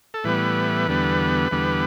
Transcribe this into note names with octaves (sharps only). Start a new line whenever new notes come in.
A4
A2 E3 G3 B3 B4
E2 D3 G3 B3
E2 D3 G3 B3